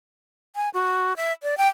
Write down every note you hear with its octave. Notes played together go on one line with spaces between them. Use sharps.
G#5
F#4
E5
D5
G5